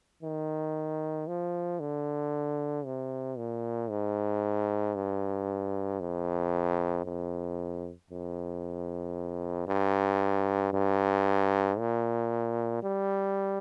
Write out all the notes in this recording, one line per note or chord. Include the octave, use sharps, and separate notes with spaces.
D#3
F3
D3
C3
A#2
G#2
G2
F2
F2
F2
G2
G2
A#2
G3